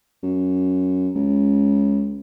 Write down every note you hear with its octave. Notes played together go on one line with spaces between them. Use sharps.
F#2
C#2